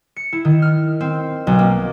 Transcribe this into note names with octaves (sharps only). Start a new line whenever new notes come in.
C#7
E4
D#3
F6
C4
B1
A#3